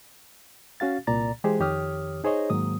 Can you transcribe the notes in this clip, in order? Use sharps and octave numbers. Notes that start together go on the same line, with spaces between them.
C#4 F#4 F5 A6
C2 A#2 D5 A#5 A6
E3 G#3 G4 G#4 C5
F2 D#3 G4 C#5 D#6 F6
D#4 G#4 C5 C#5 D#5
G#2 D#3 F#3 A#3 D#6